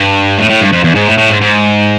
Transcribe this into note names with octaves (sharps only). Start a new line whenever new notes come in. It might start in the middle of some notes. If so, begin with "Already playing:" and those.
Already playing: G2
A2
A2
G2
F2
E2
G#2
A2
A2
G#2
G#2